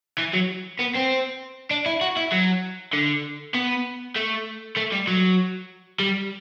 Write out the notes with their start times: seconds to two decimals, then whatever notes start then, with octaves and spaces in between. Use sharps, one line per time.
0.18 E3
0.33 F#3
0.79 B3
0.95 C4
1.71 D4
1.86 E4
2.01 F#4
2.17 E4
2.32 F#3
2.94 D3
3.55 B3
4.16 A3
4.77 A3
4.92 G3
5.08 F#3
6.00 G3